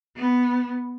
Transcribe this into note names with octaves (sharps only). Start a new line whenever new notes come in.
B3